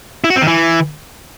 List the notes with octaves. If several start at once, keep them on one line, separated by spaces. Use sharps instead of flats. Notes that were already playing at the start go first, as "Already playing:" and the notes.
E4
F#4
C4
D#3
E3